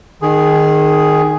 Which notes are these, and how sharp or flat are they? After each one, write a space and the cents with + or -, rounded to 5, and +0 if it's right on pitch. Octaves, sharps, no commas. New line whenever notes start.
D#3 -15 G#4 +0